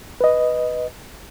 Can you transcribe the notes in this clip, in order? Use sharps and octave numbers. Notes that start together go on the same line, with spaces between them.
B4 D#5